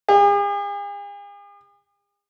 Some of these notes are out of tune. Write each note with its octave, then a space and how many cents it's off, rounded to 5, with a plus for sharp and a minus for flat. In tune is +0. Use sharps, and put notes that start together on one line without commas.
G#4 -45